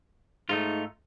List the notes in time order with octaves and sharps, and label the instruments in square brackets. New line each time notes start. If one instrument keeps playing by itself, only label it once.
[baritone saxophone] G#2 [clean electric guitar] A3 D#4 F4